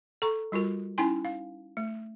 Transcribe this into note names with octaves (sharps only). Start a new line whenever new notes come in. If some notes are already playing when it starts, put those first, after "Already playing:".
A4 A#5 C#6
G3 F4 F#4 A#4
C#4 D#4 E4 G5 G#5 C6
F5
A3